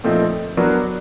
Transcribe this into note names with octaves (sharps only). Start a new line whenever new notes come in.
A#2 F3 A3 C4 D#4
F#3 B3 D4 F#4 A#4